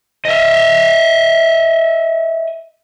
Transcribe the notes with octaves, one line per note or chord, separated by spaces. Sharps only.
D#5 E5